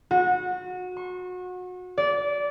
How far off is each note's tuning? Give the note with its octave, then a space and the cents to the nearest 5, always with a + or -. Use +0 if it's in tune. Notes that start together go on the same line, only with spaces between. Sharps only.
F#4 -25
C#6 -35
D5 -20